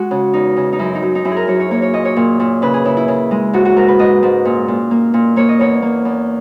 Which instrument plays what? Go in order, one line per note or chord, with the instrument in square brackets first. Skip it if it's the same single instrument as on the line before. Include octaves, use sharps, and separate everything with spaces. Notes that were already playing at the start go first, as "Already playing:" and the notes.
Already playing: [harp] G#3 F#4
C#3
E2 D#4
C#3
D#4
F#2 E4
D#4
F#2
D#4
F#2 E4
G#4
A#4
F#2 C#5
C#5
A#3 C#5
C#5
A#2 D#5
C#5
A#2
A#2
C#3 B4
G#4
C#3 E4
E4
C#3
G#3
G#2 F#4
F#4
G#2 A#4
B4
G#2 D#5
G#2
A#2
A#2
A#3
A#2
A#3 C#5
D#5
E2 C#5
A#3
E2